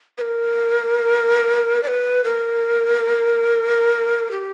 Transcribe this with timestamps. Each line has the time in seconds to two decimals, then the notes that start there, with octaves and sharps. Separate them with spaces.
0.18 B4
0.21 A#4
1.83 D5
1.88 B4
2.24 A#4
4.31 G4